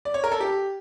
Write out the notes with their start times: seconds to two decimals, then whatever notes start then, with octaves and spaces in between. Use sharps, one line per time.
0.05 D5
0.14 C#5
0.24 A#4
0.32 A4
0.40 G4